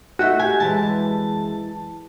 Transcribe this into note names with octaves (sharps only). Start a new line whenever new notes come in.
A3 D#4 F#4 E5
G4 G#5
F#2 E3 G#3 A5